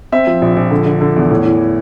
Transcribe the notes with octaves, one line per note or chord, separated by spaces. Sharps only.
C4 E5
F3
A#1
A#1
D3
D3
D3
E2
A2
E3